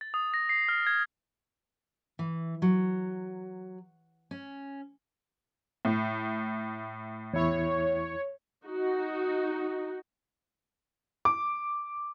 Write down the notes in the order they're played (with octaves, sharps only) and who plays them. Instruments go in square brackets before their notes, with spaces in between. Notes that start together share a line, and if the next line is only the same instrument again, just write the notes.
[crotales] A6
D#6
A#6
C7
F6
G#6
[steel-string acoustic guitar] E3
F#3
C#4
[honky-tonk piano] A2
[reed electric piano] E2 E4 [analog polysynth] C#5
[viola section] D#4 F#4
[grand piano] D6